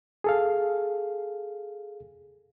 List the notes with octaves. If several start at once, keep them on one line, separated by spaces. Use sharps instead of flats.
G#4 A4 F5